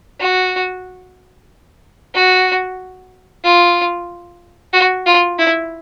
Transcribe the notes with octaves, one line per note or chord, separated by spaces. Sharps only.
F#4
F#4
F4
F#4
F4
E4